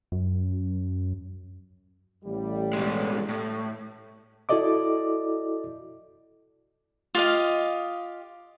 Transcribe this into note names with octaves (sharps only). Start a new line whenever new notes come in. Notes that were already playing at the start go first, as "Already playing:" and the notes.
F#2
A1 G3
B2 G#3
A2
E4 F#4 A4 D5 D#5 D6
F4 G4 D#5 F5